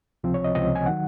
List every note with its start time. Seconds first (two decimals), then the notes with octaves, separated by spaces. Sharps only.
0.24 C#2 C3 F3 C4
0.34 C#5
0.44 D#5
0.55 C#2 C3 F3 C4 D#5
0.76 G#5
0.86 D#3 F#3 F#5